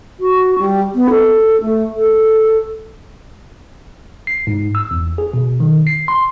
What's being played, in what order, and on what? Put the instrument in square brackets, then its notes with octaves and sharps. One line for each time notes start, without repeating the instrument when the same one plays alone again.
[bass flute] F#4
G3
B3
A4
A3
A4
[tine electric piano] C7
G#2
E6
E2
G#4
B2
D#3
C7
C6